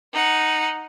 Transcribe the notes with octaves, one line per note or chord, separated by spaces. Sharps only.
D#4 F#5